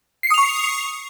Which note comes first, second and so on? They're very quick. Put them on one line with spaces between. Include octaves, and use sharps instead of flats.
C7 C#7 D#6 F7 C#6